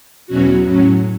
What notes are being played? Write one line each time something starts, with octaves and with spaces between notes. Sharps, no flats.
E2 B2 F#3 C#4 F#4
A2 F#3 C#4